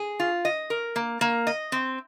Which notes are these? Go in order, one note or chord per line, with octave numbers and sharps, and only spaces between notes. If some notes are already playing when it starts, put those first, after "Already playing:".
Already playing: G#4
F4
D#5
A#4
A#3
A#3
D#5
C4